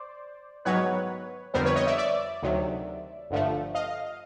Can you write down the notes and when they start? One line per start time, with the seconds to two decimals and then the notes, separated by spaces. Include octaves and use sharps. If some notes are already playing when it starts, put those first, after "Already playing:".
Already playing: C5 D5
0.65 G#2 D#3 F#3 B3 B4 C#5
1.54 F2 D3 G3 B3 A#4 C5
1.65 B4 C#5
1.76 C#5 D#5
1.87 D5 E5
1.98 D5 E5
2.42 D2 C3 D#3 F#3
3.30 G1 G2 D3 F3 A3
3.75 D#5 F5